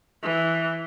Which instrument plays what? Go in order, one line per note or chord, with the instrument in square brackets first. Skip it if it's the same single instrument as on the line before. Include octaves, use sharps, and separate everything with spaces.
[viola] E3